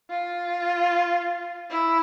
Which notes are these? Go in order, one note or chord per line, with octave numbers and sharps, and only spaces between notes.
F4
E4